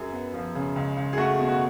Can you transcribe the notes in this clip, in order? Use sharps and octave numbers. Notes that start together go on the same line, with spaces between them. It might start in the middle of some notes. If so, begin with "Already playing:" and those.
Already playing: F#2 G#4
B3
F3
C#3
C#2
C#2
G#4
A3 F#4
B2
F#4